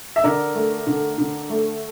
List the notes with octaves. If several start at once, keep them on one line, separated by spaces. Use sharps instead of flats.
E5
D3 A#4 D5
A3
D3
D3
A3